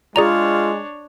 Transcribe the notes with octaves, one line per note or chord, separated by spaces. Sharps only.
G#3 D4 F4 G#4 C#5 D5 A#5